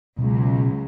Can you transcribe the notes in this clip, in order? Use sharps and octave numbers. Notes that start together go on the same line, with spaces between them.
C#2 B2 F#3